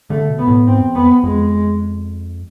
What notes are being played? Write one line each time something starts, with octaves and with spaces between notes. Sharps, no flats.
D3 A3
B2
B3
A2
G#2 C4
E2
F2 B3
F2 G#3